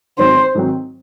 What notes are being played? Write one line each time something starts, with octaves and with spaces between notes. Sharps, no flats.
G#2 D#3 F#3 C4 C5
G#2 D#3 F#3 C4